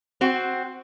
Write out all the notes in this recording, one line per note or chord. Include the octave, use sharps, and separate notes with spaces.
C4 F#4